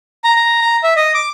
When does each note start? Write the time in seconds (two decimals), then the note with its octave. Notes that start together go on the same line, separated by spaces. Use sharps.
0.24 A#5
0.36 A#5
0.62 A#5
0.83 E5
0.96 D#5
1.14 D6